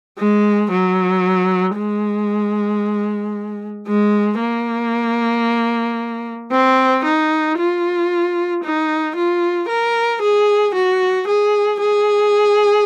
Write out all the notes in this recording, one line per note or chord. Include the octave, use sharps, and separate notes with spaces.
G#3
F#3
G#3
G#3
A#3
C4
D#4
F4
D#4
F4
A#4
G#4
F#4
G#4
G#4